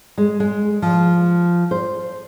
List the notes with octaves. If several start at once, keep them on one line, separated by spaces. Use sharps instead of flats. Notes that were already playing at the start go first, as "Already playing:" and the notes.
G#3
G#3
F3
C5